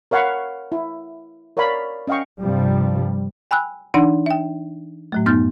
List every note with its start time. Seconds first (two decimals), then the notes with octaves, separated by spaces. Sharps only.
0.11 A#4 C#5 F5 F#5 B5 C#6
0.72 E4
1.57 A#4 C#5 D5 F5 B5
2.07 C#4 D#5 F5 G5 C#6
2.41 G2 C3 F3 G3
3.51 G5 G#5 B5 E6 F#6
3.94 E3 D4 D#4 F#5 A#6
4.26 E5 G5
5.12 A2 F#3 A3
5.26 F#2 B3 D#4 F6 G6 A6